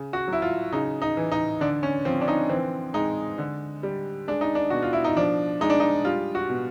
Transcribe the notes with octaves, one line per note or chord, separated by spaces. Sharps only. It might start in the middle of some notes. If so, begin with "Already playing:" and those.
Already playing: C#3
F#4
F#3 E4
F4
C#3 D#4
D#4
E3
D#4
D3 D4
C#4
F3 C4
D4
D#4
E3 C4
G#3 D#4
D3
G3
G#3 D4
D#4
D4
B2 F#4
F4
E4
D#4
F3 D4
G#3 D#4
D4
D#4
G3 F4
F#4
B2